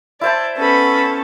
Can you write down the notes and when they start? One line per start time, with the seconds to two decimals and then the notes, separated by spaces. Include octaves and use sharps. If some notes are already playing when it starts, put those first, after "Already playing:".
0.21 E4 C5 D5 A5
0.57 B3 C#4 A4 B5